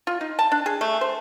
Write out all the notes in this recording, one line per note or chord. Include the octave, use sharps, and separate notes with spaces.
F4
D#4
A5
D4
G#4
A3
C5